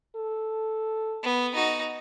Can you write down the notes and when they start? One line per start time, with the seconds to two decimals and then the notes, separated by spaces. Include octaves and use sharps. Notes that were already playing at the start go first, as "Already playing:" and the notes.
0.16 A4
1.23 B3
1.55 D#4 F#4